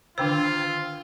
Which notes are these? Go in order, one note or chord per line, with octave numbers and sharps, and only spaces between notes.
D3 D#3 D4 F4 C5 G5 E6